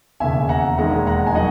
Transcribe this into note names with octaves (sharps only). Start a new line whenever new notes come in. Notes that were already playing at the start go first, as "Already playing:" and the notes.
E1 D#2 C#3 E5 G#5
F#5 A#5
E1 D#2 D#3 G#3 F#5 A#5
F#5 A#5
G#5
D#3 F#3 D#5 F#5